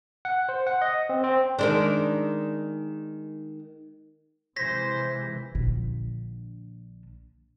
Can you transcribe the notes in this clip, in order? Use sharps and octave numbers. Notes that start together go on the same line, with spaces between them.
F#5
C5
F#5
D#5
C4
C4
D#3 G#3 D4
C3 E3 G#3 C5 G#6 A#6 B6
A#1 D3